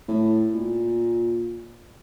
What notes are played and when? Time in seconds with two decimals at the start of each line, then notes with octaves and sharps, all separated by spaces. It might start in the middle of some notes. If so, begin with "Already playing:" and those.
0.08 A2
0.54 A#2